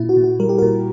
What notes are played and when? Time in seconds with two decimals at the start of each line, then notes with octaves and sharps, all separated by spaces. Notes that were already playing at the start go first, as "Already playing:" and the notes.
Already playing: A#2 E4
0.09 F#4
0.17 A#2
0.24 F#4
0.40 G3 A#4
0.49 G4
0.58 A#2 F#4 A#4